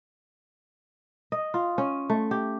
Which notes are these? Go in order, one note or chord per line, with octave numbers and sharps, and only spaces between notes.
D#5
F4
C#4
A3
G4